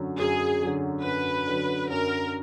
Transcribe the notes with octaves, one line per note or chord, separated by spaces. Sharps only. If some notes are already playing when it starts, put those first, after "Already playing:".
Already playing: F#2 D3 F#3
F#2 G#4
D3 F#3
F#2 B4
D3 F#3
F#2 A#4